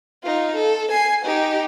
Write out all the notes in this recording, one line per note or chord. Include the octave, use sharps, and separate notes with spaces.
D#4 F4
A4
G#5 C7
D#4 G4